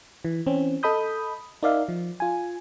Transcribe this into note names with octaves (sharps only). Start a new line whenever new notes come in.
E3
E3 C4 C#4
A4 D#5 B5 D#6 G6
D#4 A#4 D5 E5 F5
F3
F4 G#5